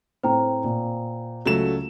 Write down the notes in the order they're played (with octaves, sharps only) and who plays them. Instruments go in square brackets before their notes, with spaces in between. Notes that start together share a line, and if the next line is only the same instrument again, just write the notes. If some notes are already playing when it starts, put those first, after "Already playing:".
[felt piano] A2 C4 [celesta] C5 G5 A#5
[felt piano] A#2
[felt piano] C#2 [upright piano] F#3 A3 E7